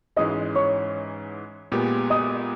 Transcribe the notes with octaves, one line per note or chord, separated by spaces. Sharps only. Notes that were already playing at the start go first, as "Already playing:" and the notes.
G#2 E3 G#3 C#4 D#5 D#6
C#5 C#6
A#2 G#3 B3 G4
D#5 D#6